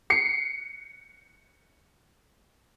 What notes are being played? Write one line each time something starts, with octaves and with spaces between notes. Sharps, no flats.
C7 C#7